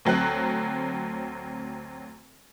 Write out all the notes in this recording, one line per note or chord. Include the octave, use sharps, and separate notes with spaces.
D2 F#3 C4 F#6